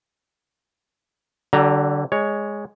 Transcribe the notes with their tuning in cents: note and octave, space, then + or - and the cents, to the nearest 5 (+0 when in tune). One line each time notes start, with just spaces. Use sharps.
D3 +0 G3 -45 A#5 -5
G#3 -5 C#5 +10